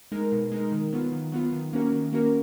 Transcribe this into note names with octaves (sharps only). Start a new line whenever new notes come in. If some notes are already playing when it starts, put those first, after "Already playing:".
G#3 D#4 A#4
B2
G#3 D#4 A#4
D#3
F#3 B3 F4
D#3
F#3 B3 F4
D#3
A#3 C#4 F#4 A#4
D#3
A#3 C#4 F#4 A#4